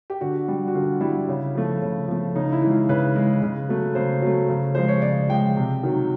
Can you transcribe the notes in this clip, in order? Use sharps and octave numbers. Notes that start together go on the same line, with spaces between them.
G4
D3 F#4
G3
F#4
D3 F4
G3 E4
C#3
F3 A3
C#3
F3 A3
C#3 D#4
E4
E3 G#3
F4
C#3 B4
E3 G#3
C#3
F#3 A3
C#3 C5
F#3 A3
C#3
F3 G#3 C5
C#5
C#3 D5
F3 G#3 G5
C3
D#3 F#3